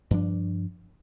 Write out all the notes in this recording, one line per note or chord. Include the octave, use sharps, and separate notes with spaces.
G2 F3 D4